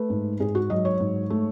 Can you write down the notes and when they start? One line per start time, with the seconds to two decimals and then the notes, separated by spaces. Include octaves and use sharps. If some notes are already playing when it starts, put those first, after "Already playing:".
Already playing: A3 B4
0.10 G#2
0.40 G#2 G#4
0.55 F#4
0.70 F#3 D#5
0.85 C#5
1.00 G#2
1.30 A3